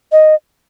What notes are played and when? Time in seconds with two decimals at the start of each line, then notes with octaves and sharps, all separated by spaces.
0.12 D#5